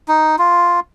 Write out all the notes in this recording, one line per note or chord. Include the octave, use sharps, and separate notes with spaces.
D#4
F4